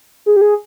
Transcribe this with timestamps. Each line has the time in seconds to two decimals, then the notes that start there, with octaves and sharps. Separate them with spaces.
0.26 G#4
0.36 G4
0.41 G#4